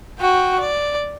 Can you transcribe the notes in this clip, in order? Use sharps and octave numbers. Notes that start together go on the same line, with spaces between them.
F#4 G5
D5